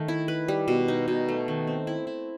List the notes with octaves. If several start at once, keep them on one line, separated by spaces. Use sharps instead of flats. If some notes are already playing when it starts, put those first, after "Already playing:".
Already playing: D#3 A3
E4
B4
G3
B2
D#4
B2
A3
D#3
C4
E4
E4